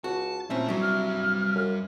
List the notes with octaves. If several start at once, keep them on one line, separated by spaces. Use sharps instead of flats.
C#2 F#4 A5
A#2 A3 C4 C#4 E4 A5
C2 F#3 G3 D4
F6
F#2